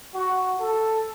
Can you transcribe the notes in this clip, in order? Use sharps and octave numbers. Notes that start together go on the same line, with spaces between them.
F#4
A4